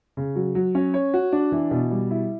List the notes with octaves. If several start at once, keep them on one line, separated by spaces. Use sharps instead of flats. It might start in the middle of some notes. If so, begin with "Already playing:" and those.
C#3
F#3
F#3
C#4
C#5
F#4
D4
E3
B2
G3
E4